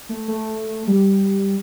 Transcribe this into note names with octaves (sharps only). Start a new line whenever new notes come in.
A3
A3
G3